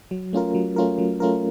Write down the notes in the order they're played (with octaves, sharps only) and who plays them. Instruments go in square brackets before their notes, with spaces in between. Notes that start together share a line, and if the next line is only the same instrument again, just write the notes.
[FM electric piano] F#3
A3 C#4 F4 A#4
F#3
A3 C#4 F4 A#4
F#3
A3 C#4 F4 A#4